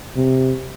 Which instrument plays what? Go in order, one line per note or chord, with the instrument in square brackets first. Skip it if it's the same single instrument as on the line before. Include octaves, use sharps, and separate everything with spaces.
[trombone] C3